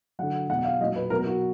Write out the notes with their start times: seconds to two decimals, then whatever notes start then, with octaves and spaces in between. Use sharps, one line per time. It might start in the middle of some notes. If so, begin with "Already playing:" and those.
0.19 D3 F#3 F#5
0.49 B2 F#3 F#5
0.65 F5
0.80 F#3 D#5
0.84 A#2
0.96 B4
1.10 B2 F#3 A#4
1.26 F#4